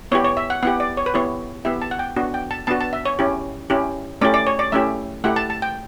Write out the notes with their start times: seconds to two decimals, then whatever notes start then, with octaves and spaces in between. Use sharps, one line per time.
0.12 B3 E4 G4 C#5
0.24 C#5
0.37 E5
0.50 F#5
0.63 B3 E4 G4 F#5
0.80 D5
0.97 C#5
1.06 B4
1.14 B3 E4 G4 C#5
1.65 B3 E4 G4 E5
1.82 A5
1.91 F#5
1.99 G5
2.16 B3 D4 F#4
2.34 G5
2.51 A5
2.67 B3 D4 F#4 A5
2.81 A5
2.93 E5
3.05 C#5
3.19 C#4 E4 G4
3.70 C#4 E4 G4
4.21 A3 C#4 E4 G4 D5
4.34 D5
4.47 C#5
4.59 D5
4.72 A3 C#4 E4 G4 E5
5.24 A3 E4 G4 F#5
5.36 A5
5.50 A5
5.62 G5